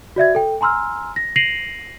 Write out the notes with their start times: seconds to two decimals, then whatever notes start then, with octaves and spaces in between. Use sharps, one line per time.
0.16 F#4 D5 E5 G#6
0.35 A4 G5
0.61 G#5 A#5 C6 E6 F6
1.16 A#6
1.36 A#6 C7 D7 D#7 F7 F#7